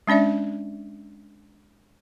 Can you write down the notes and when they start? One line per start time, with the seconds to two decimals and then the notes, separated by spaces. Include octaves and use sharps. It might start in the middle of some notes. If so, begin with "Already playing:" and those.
0.07 G#3 C#4 D4 D5 E5